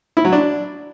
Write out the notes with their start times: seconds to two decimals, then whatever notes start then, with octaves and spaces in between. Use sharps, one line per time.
0.17 E4
0.25 F#3
0.33 D4